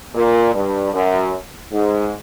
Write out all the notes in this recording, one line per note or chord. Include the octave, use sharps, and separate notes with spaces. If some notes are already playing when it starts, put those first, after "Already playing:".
A#2
G2
F#2
G#2